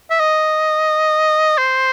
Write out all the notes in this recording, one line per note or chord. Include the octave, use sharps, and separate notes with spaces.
E5
D#5
C5